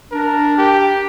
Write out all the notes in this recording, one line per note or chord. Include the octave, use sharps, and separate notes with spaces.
D4 A#4
G4